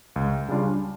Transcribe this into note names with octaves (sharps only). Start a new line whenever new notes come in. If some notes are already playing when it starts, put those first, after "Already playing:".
C#2
C#3 G3 D4 F4